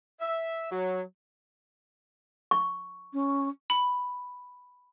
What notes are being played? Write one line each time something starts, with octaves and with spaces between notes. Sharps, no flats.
E5
F#3
C#6
C#4
B5